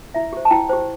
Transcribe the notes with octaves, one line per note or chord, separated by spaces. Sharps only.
E4 E5
G4 C5
A5
E4 G5
G4 C5